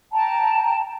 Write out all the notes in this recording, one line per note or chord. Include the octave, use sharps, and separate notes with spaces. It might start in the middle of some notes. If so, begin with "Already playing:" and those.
G5 A5 A#5